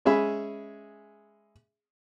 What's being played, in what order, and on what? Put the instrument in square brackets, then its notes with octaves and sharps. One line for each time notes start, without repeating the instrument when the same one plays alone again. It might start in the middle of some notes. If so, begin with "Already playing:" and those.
[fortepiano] G#3 C#4 G#4 E5 B5